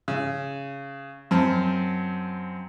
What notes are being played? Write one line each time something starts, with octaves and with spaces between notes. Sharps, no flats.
C#3
F#2 C4 A5